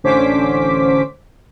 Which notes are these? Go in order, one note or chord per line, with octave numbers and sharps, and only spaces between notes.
A1 D3 C#4 C5 D6 B6